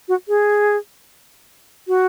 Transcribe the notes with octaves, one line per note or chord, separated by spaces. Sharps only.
F#4
G#4
F#4